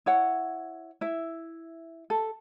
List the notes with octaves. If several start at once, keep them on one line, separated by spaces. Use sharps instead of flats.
E4 C#5 F#5
E4 E5
A4